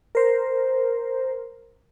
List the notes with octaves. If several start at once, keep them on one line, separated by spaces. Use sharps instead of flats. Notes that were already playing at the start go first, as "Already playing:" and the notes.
A#4 C5